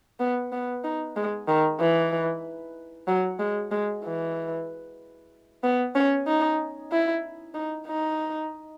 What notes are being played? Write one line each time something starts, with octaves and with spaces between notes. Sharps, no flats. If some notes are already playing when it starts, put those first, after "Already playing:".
B3
B3
D#4
G#3
D#3
E3
F#3
G#3
G#3
E3
B3
C#4
D#4
E4
D#4
D#4